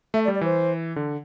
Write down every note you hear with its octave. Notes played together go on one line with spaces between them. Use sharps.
A3 E5
D5
G3
D5
E3 C5
D3